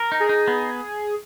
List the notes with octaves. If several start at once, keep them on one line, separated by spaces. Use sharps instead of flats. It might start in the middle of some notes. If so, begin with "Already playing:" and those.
Already playing: A#4
D#4
G#4
D#4
B3